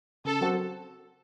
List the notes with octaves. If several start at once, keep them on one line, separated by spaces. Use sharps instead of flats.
C#3 A4
F#3 C4 F#4